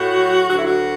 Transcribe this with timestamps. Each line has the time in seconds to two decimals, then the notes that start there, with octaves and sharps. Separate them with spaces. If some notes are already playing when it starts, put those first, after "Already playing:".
Already playing: A2 F#4
0.17 F#3
0.50 D2 F#4
0.59 E4
0.67 F#4